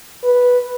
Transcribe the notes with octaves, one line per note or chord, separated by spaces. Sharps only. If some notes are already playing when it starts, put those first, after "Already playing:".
B4